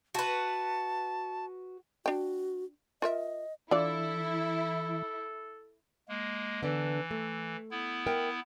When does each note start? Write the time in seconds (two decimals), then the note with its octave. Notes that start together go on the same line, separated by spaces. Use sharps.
0.14 F#4 B4 A5
2.06 D4 F#4 G5
3.02 F4 A#4 D#5 E5
3.71 E3 D4 E4 F4 A4 D5
6.09 G#3 A#3
6.62 D3 E3 B3 D4
7.11 A3
7.71 B3 E4
8.07 A#4 E5 G5